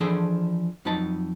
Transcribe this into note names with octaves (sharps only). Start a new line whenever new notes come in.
E3 F3 D4 G#4 A4 C5
F2 F#3 D#4 B4 A5